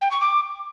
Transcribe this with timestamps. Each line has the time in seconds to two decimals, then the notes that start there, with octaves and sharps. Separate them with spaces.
0.01 G5
0.11 C#6
0.21 D6